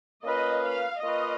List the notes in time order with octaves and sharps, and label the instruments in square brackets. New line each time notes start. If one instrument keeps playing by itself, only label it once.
[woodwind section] A#3 C#4 F4 B4 [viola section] D#5
[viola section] F5
[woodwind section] A#3 C#4 F4 B4 [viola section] D#5